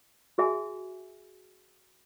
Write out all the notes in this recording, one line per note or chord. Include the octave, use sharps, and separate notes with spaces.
F#4 G#4 E5 G#5